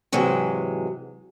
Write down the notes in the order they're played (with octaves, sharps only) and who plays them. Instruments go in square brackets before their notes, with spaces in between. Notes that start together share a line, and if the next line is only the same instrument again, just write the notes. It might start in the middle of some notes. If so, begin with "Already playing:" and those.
[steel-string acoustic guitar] G#2 C3 E3 F#3 G#3